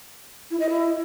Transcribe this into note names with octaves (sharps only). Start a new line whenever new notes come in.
E4
D#5
E4